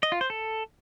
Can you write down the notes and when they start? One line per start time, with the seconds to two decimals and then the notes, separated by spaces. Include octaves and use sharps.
0.03 D#5
0.12 F4
0.21 C5
0.30 A4